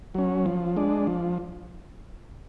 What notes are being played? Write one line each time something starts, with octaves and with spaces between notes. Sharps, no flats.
F#3 C#4
F3
G#3 D4
F3